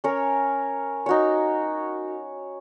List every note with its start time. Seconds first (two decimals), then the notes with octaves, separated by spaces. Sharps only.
0.04 C#4 A#4 C#5
1.06 D#4 F#4 C#5